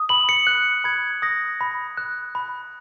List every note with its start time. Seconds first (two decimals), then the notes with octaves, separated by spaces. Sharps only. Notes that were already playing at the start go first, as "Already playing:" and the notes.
Already playing: D#6
0.09 B5 F#7
0.29 C#7
0.47 F#6
0.84 B5 G#6
1.22 D#6 A#6
1.61 B5
1.97 F#6
2.35 B5